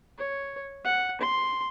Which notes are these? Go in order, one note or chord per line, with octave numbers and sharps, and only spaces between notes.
C#5
F#5
C6